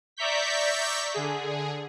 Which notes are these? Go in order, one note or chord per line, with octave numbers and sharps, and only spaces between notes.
D5 E5 A#5 C#6 G6 B6
D3 G#4